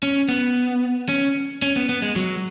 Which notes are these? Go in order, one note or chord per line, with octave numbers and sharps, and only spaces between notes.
C#4
B3
C#4
C#4
B3
B3
G#3
F#3